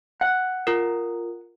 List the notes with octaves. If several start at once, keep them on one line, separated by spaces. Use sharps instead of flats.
F#5
F4 A#4